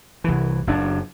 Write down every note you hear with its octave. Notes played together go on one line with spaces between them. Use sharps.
C2 E3
F#1 F#2 D4